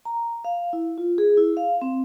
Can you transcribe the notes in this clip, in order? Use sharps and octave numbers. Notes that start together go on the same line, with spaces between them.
A#5
F5
E4
F4
G#4
E4
F5
C4